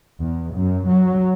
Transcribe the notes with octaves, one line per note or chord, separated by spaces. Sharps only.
E2
F#2
F#3